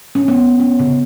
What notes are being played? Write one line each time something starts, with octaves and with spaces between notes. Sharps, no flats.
C#4
B3
C#4
C#3